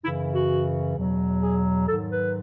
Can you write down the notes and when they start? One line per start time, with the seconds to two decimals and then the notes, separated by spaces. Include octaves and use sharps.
0.04 F#2 C#3 E3 E4
0.34 F#4
0.96 E2 B2 F#3
1.41 G#4
1.88 G#2 D#3 F#3 A4
2.11 B4